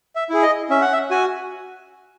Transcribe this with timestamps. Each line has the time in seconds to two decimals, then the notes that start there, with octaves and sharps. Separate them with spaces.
0.16 E5
0.30 E4 G#4
0.43 D#5
0.70 C#4 E5
0.82 F#5
0.93 E5
1.11 F#4 G#5